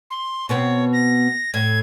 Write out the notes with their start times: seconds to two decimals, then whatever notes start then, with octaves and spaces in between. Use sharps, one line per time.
0.11 C6
0.49 B2 B3 C4 C#5
0.93 A#6
1.54 A2 G#6